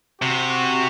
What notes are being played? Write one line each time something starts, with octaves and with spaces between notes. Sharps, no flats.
C3 F#4